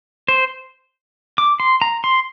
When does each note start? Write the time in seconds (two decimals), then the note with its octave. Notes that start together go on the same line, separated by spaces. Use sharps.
0.28 C5
1.38 D6
1.60 C6
1.82 A#5
2.04 C6